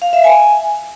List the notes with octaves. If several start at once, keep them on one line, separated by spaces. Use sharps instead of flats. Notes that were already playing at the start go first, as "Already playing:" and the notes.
F5
E5
G#5